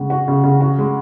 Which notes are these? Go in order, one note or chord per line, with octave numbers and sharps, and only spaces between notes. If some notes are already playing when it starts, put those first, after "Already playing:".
Already playing: C#3 G#3 F#4
F#4
C#3
C#3
F#4
G#3